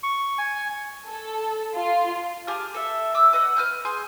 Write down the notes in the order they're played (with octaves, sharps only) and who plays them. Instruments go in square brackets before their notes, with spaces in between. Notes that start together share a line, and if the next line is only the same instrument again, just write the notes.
[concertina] C#6
G#5
[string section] A4
F4
[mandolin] G4 G#4 A5 F6
A4 E5
E5 D6 E6
B4 D#5 F#5
B4 F6 G6
G#4 G#5 C6 G6